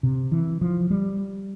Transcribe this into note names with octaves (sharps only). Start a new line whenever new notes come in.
C3
E3
F3
G3